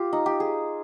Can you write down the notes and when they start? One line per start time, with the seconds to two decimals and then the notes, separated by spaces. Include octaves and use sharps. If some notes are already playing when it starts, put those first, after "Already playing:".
Already playing: F4 G4
0.13 D#4
0.26 G4
0.40 G#4